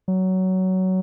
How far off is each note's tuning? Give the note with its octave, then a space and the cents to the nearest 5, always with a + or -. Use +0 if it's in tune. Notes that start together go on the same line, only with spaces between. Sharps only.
F#3 +15